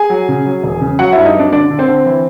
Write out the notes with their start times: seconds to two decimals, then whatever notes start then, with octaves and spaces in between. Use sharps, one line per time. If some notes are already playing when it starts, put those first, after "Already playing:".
Already playing: G#4 G#5
0.10 F#3
0.29 C#3
0.45 F#3
0.63 E1
0.81 C#3
0.99 F#3 F#4 F#5
1.12 G2 E4 E5
1.25 D#4 D#5
1.35 F#3 D4 D5
1.52 D3 D4 D5
1.70 D3
1.79 C4 C5
1.88 D3
2.06 E3